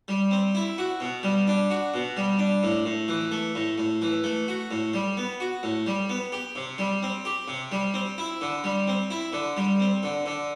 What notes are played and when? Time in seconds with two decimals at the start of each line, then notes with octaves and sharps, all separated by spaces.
0.08 G3
0.31 C4
0.55 E4
0.78 F#4
1.00 B2
1.23 G3
1.47 D4
1.70 F#4
1.94 B2
2.17 G3
2.39 D4
2.63 A2
2.86 A2
3.08 E3
3.32 A3
3.55 A2
3.78 A2
4.02 E3
4.24 A3
4.48 F#4
4.71 A2
4.94 G3
5.17 B3
5.40 F#4
5.63 A2
5.87 G3
6.10 B3
6.32 G4
6.56 C3
6.78 G3
7.03 C4
7.25 G4
7.48 C3
7.72 G3
7.94 C4
8.18 E4
8.41 D3
8.64 G3
8.87 C4
9.11 E4
9.33 D3
9.57 G3
9.80 C4
10.03 D3
10.26 D3